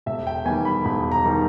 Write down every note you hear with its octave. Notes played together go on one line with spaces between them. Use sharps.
E1 E5
G5
E2 D#3 G3 G#5
B5
E1 B5
A#5
D#3 G3